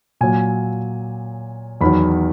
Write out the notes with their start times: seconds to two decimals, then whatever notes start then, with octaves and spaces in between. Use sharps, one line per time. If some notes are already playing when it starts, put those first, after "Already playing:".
0.21 A#2 F#3 G#5
1.81 E2 D#3 F#3 B5